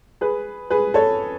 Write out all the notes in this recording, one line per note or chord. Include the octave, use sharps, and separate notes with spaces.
G#4 B4
G#4 B4
A4 C#5